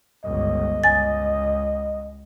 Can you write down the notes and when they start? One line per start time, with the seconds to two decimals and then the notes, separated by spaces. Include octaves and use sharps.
0.24 G1 C#2 D#5
0.84 C#2 G#5 A6